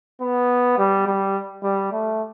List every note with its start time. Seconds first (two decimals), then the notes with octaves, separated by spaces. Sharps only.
0.21 B3
0.78 G3
1.07 G3
1.64 G3
1.92 A3